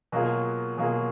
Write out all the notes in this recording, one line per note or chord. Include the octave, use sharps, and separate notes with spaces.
B2 F#3 A#3 F4 G#4
B2 F#3 A#3 F4 G#4